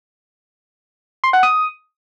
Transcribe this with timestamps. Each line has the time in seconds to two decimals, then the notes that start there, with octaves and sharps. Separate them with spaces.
1.24 C6
1.33 F#5
1.43 D#6